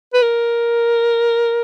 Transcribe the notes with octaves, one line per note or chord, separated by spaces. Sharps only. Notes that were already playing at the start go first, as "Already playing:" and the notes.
B4
A#4